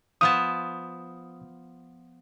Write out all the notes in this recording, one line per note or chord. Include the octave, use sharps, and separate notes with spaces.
F3 B3 A5 D#6